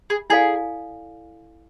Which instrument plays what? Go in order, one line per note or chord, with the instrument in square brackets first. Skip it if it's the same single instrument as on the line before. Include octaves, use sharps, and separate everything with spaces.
[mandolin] G#4
[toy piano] E4 A4 D5 F5 G#5 [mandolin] G#4